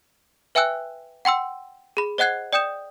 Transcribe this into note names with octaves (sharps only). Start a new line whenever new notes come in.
B4 E5 G5 G#5 E6 F#6
F#5 G5 C6 E6
G#4 B5
C5 D#5 F#5 F#6 G#6 C7
D5 G5 D#6 G6 E7